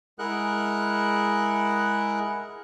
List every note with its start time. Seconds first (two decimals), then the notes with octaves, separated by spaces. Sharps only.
0.19 G#3 E4 G#4 A#4 F#5 F#6